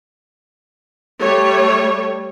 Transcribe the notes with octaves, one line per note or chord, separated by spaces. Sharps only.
G3 A3 C#5